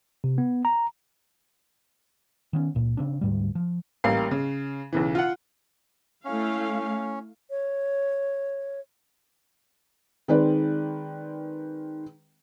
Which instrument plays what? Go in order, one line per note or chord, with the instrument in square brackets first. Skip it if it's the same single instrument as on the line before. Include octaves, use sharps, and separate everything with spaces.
[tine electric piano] C3
B3
A#5
[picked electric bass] D#3 B3 C#4
C#2 A#2
C#3 C4 D4
D2 G#2 G3
F3
[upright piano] A1 G3 A#3 F5 C7
C#3
B1 C#3 E3
F4 F#5
[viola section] A3 E4 F5 [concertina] C#4
[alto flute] C#5
[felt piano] D#3 G#3 C4 B4 D5